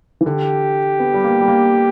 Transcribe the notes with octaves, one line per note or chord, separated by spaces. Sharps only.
E3
D3 G4
B3
G3
A#3
G3
A#3